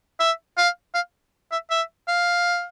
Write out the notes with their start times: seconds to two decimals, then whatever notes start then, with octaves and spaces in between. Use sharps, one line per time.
0.20 E5
0.58 F5
0.95 F5
1.52 E5
1.71 E5
2.08 F5